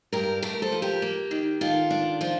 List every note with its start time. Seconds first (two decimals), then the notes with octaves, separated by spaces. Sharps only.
0.12 G2 G4 A#4
0.42 A3 G4 A#4
0.62 A4 C5
0.72 F3
0.82 G4 A#4
1.02 A#3
1.31 D#3
1.61 D#3 F4 A4
1.91 D4
2.21 F3 F4